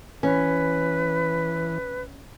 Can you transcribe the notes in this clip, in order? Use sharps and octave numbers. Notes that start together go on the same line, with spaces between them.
E3 C#4 B4